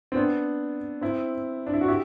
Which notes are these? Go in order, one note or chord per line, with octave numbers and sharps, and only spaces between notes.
C4
B3 D4
C4 E4
D4
E4
F#4
E4 G4